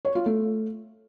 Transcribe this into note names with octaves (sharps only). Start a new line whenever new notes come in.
C#5
F4
A3